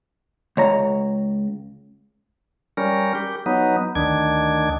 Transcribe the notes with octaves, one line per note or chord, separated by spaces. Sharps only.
C#2 C#5 A#5
G3 C#4 A#4
G4
F#3 B3 D#4
D2 D#3 D4 G#6